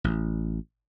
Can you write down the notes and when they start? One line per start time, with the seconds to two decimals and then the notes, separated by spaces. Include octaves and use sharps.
0.04 A1